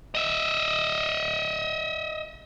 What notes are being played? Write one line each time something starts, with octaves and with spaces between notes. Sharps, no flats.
D#5 E5